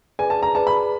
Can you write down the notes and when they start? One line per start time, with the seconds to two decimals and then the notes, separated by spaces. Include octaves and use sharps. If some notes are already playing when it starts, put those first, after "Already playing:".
0.19 G#4 B4 D5 G#5
0.30 A5
0.43 A#5
0.55 G#4 B4 D5 A5
0.67 B5